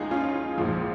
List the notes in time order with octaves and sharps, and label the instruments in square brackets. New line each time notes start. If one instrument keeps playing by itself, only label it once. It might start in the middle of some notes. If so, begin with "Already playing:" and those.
Already playing: [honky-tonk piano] C#2 F3 D#4 G#4
C#4 F4
A#1 G#2 F3